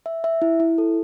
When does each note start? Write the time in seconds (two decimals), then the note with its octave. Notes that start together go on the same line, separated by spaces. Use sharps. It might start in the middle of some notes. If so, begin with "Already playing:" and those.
0.06 E5
0.24 E5
0.42 E4
0.60 E4
0.78 A4